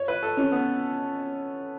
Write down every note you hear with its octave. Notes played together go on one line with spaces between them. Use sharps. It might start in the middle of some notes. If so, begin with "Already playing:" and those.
Already playing: C#5
B4
A4
C#4
B3